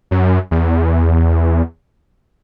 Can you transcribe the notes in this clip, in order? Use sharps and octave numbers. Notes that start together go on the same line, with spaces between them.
F#2
E2